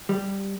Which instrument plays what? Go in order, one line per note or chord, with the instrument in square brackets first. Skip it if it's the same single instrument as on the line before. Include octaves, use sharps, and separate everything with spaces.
[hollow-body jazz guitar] G3